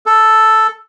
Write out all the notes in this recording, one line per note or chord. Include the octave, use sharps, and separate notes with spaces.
A4